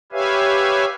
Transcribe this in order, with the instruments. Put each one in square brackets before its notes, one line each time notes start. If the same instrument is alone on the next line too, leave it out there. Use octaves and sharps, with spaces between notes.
[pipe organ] G4 B4 C#5 E5 F5 G#5